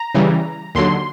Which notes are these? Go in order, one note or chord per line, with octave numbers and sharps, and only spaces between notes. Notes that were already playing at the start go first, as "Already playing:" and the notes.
Already playing: A#5
C#3 E3 G3
D#2 D3 F#3 C6